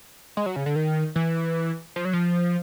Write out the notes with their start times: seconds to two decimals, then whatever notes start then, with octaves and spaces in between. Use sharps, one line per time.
0.37 G#3
0.46 F#3
0.56 C#3
0.66 D3
0.76 D#3
1.16 E3
1.96 F3
2.05 F#3
2.13 F3